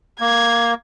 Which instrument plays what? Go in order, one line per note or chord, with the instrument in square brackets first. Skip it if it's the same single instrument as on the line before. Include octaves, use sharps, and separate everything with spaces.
[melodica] A#3 [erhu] G#6